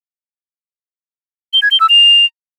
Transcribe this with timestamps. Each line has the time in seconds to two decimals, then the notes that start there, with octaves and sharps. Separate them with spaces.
1.53 G7
1.62 G#6
1.71 G7
1.80 E6
1.89 F7